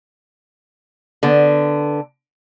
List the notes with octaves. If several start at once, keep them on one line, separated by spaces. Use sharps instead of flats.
D3 B3